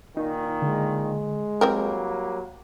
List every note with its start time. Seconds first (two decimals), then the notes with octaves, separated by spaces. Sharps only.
0.17 A#2 D#3 D#4
0.62 D3 G#3
1.61 E3 F#3 G3 A#3 C4 A#4 G5